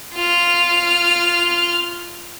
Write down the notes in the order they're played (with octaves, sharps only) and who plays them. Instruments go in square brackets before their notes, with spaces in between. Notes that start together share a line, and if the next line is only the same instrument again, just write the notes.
[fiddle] F4 F6